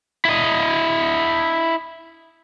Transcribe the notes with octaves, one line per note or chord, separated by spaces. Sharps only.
E4 D#5